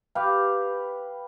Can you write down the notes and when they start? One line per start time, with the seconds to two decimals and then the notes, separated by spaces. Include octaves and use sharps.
0.15 G4 B4 F5